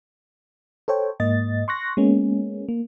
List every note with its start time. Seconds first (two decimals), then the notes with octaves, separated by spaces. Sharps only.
0.88 A4 C5 C#5 G5
1.20 G#2 A#3 D#5 A6
1.68 C6 C#6 F#6 A#6
1.97 G#3 A#3 B3 C#4
2.69 A#3